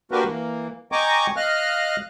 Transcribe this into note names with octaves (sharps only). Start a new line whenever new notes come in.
A#3 D4 F#4 G4 A#4 B4
E3 A#3
D#5 G5 G#5 A#5 C#6 D6
D#5 F5 F6 F#6